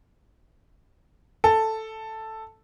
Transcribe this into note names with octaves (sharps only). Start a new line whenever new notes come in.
A4